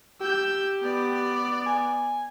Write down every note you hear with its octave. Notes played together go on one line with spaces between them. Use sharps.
G4 E6 G6
B3 D5
G#5